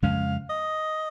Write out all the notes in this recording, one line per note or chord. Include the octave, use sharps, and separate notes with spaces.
F2 C#3 G#3 C#4 F5
D#5